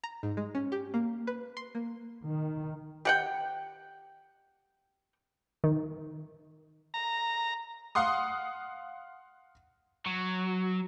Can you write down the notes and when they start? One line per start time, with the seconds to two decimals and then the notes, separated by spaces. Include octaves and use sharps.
0.04 A#5
0.23 G#2
0.37 G#3
0.55 C#4
0.72 G4
0.94 A#3
1.27 B4
1.57 C6
1.75 A#3
2.27 D#3
3.05 G4 F#5 G5
5.64 D#3
6.94 A#5
7.95 F5 F#5 C6 D#6
10.06 F#3